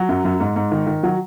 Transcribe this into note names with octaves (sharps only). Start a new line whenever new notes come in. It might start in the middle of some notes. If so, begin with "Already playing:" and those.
Already playing: F#3
F#2
F#2
G#2
G#2
D#3
D#3
F#3